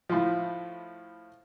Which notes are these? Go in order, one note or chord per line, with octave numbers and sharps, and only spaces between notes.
A2 F3